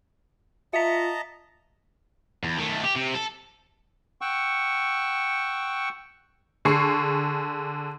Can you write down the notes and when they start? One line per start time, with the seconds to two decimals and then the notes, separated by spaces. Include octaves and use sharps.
0.73 F4 D#5 E5 A5 A#5 B6
2.44 E2
2.58 D#3 A3
2.83 G4
2.96 C3
3.15 A4
4.21 F#5 G5 C#6 E6
6.65 D3 G#4 C#6 C7